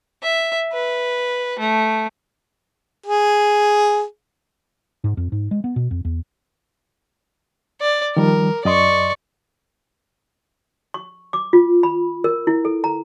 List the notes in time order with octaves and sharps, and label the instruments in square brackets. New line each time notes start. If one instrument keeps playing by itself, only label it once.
[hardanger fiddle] E5
B4
A3
[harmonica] G#4
[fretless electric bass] G#2
F2
G#2
G#3
B3
B2
F2
E2
[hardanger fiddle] D5
[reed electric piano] D#3 F3 G3 [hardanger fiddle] A#4
[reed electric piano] F#2 D#5 C6 [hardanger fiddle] D5 C#6
[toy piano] C#6
D6
F4
B5
A#4
E4
A4
A#5